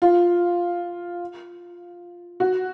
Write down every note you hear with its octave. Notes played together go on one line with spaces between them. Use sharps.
F4
F#4